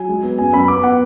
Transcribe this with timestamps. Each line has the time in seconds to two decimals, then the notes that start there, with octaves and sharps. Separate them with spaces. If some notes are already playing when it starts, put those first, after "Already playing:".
Already playing: F#3 G#5
0.09 G#3
0.23 B3
0.38 F#2 G#5
0.53 F#2 B5
0.68 B3 D6
0.83 B3 F#5